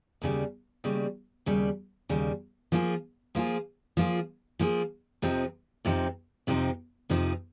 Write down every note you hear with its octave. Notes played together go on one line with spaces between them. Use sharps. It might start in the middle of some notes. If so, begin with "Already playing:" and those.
D#2 C#3 G3
D#2 C#3 G3
D#2 C#3 G3
D#2 C#3 G3
F3 A#3 F4 G#4
F3 A#3 F4 G#4
F3 A#3 F4 G#4
F3 A#3 F4 G#4
F2 C3 F3 C4 D#4
F2 C3 F3 C4 D#4
F2 C3 F3 C4 D#4
F2 C3 F3 C4 D#4